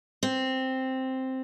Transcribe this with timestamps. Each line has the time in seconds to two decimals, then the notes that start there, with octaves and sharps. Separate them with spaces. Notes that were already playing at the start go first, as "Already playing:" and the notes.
0.23 C4